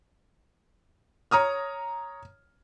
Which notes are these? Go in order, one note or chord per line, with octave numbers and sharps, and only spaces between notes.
C#5 A#5 D#6 F6